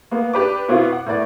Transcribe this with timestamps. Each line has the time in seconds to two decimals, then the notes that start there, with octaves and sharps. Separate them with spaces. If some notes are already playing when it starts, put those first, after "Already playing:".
0.11 A#3 B3
0.34 D4 G4 B4 D6
0.69 B2 B3 C4 E4 F4
0.92 F#5
1.06 A2 A3 B3 D5